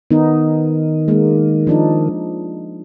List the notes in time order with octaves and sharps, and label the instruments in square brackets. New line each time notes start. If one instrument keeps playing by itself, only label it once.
[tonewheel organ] D#3 [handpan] B3 D#4
[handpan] G#3 A#3
F3 D4 D#4